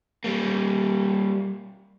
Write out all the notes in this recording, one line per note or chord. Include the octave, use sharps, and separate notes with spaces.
G3 A#3